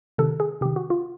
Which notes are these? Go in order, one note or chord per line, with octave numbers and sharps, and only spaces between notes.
C3 D#3 A4
G#4
C3 D#3 G4
F#4
F4